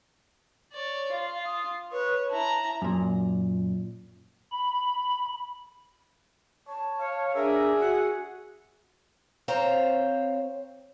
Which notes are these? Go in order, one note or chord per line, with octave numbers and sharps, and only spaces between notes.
C#5 D5
F4 F5
D#6
B4 C#5
E4 A5 A#5
F#2 A#2
B5
C#5 A5
C#5 F5
D4 G#4 A#4 E5
F#4 F#5
C4 C5 C#5 F5 A#5